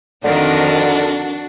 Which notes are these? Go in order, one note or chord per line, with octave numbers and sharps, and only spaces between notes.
F2 D3 D#3 D4 F#4 A#4